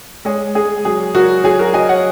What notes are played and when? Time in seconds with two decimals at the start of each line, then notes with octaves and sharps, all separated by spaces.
0.25 G#3 G#4 C#5
0.55 G#3 G#4
0.85 F#3 G#4
1.15 F#3 F#4 A#4
1.44 F#3 G#4
1.59 F#4 A#4
1.74 F#3 D#5 G#5
1.89 C#5 F#5